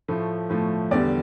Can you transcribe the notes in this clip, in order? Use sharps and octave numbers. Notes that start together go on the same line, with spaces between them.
A2 F3 A3
A2 F3 A3
E2 D3 G3 D5